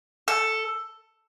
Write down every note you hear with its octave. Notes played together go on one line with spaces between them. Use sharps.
A4